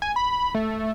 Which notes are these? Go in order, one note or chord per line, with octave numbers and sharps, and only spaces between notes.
G#5
B5
A3